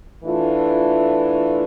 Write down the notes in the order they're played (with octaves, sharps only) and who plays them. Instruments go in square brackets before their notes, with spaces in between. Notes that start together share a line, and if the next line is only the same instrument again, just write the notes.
[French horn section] E3 A3 D4 F4